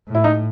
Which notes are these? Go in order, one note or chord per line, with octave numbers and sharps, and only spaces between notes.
A2
E4
D#4